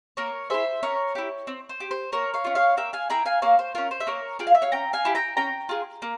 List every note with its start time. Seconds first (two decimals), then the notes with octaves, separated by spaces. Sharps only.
0.17 A#3 A#4 C#5
0.50 E4 G#4 C5 E5
0.83 C#4 A#4 C#5
1.15 E4 G4
1.47 C4
1.69 C5
1.80 G4
1.91 C5
2.12 A#3 A#4 C#5
2.34 C#5 F5
2.44 C#4 F4
2.55 C#5 F5
2.77 A#3 E5 G5
2.93 F5 G#5
3.10 E4 G#4 G5 A#5
3.26 F5 G#5
3.42 A#3 C#5 F5
3.59 C5
3.75 C#4 F4 A#4
3.91 C5
4.00 E5
4.07 A#3 A#4 C#5
4.39 F4 G#4 G5
4.47 F5
4.55 E5
4.62 C#5 F5
4.72 C#4 G5 A#5
4.93 F5 G#5
5.05 E4 G4
5.15 G5 A#5
5.37 C#4 G5 A#5
5.69 F4 G#4
6.02 A#3